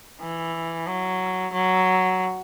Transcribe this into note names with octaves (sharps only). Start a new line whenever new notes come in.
E3
F#3
F#3